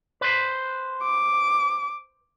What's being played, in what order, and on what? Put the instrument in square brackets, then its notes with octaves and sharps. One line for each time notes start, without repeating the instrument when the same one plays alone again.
[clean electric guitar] B4 C5
[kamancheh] D6